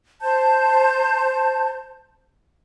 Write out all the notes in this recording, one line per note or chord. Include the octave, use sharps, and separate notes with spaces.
C5 A5 G6